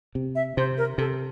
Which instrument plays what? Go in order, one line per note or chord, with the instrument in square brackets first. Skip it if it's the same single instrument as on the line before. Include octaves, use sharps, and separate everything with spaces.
[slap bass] C3
[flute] E5
[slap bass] C3 [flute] C5
[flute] A#4
[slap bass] C3 [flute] A4